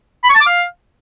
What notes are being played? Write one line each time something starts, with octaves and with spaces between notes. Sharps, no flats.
B5
C#6
A5
D6
F5